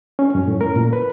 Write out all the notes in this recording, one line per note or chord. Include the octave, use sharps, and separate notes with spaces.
C#4
F#2
A2
A#4
A#2
B4